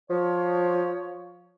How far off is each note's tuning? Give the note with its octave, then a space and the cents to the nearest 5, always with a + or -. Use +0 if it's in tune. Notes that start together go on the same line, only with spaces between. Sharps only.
F3 +15 C#5 +15